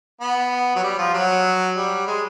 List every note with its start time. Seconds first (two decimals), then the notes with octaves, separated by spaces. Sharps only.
0.21 B3
0.76 F#3
0.83 G3
0.98 F3
1.14 F#3
1.77 G3
2.07 G#3